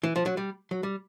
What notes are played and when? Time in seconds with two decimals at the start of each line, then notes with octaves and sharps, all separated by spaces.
0.03 E3
0.16 F3
0.26 F#3
0.37 G3
0.71 F#3
0.83 G3